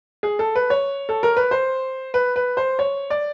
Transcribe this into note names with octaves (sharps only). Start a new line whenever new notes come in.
G#4
A4
B4
C#5
A4
A#4
B4
C5
B4
B4
C5
C#5
D5